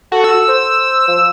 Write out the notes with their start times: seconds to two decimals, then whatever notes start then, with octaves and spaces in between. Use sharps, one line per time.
0.12 F#4 A4
0.24 E6
0.48 C5
1.08 F3